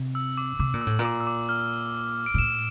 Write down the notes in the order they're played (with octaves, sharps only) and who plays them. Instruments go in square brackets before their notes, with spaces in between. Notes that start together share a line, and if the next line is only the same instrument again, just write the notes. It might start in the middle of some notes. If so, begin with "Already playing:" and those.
Already playing: [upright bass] C3
[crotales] E6
D6
[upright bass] C3 [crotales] D6
[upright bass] A#2
[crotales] E6
[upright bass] A2
A#2
[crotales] D6
E6
D6
F6
D7
[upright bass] A#2
[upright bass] A2 [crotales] E7